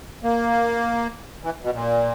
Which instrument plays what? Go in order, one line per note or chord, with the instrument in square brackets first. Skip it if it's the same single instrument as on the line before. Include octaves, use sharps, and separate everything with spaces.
[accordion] A#3
E3
B2
A#2